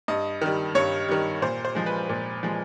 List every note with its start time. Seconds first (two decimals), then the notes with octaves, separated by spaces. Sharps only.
0.08 G2 D#5
0.41 D#3 G3
0.75 G2 C#5
1.08 D#3 G3
1.42 A#2 C5
1.65 C5
1.75 F3 G#3
1.86 B4
2.09 A#2
2.43 F3 G#3